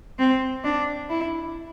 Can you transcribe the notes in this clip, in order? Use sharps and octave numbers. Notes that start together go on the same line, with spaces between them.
C4
D4
E4